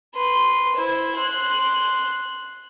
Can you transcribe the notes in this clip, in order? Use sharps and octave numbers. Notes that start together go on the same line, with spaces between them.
B4 C6
E4 C5
C6 F#6